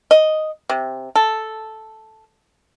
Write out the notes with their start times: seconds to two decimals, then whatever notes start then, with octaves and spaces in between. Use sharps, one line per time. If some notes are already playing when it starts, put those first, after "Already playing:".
0.11 D#5
0.69 C3
1.16 A4